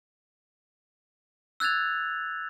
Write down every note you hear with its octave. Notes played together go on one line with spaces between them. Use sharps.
E6 F#6 G#6 A6 F7